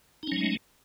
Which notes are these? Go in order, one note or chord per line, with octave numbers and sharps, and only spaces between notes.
F#3 G#3 A3 C#4 D#4